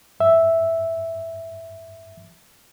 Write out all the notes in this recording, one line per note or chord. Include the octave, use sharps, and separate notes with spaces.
G2 E5